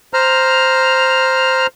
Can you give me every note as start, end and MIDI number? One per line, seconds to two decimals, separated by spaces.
0.14 1.67 72
0.14 1.67 82
0.14 1.67 89